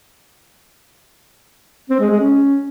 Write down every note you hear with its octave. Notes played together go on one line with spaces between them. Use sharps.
C4
G#3
G#3
C#4